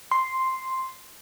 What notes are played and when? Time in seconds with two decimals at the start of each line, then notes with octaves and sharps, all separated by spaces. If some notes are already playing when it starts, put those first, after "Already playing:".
0.11 C6